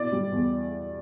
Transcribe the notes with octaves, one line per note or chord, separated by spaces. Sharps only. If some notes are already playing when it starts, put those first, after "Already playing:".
Already playing: B2 E4 D5
G3
E2